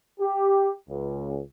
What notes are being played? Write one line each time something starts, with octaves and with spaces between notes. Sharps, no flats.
G4
C#2